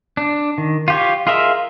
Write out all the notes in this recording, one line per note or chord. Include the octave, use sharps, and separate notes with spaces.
D4
D#3
F4 G4 C#5
F4 G#4 A#4 D#5 E5